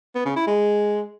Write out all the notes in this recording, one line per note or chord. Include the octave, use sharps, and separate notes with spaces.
B3
C#3
E4
G#3